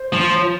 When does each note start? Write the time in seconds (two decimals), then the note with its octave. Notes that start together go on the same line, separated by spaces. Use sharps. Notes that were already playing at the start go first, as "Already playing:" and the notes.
Already playing: C5
0.13 F3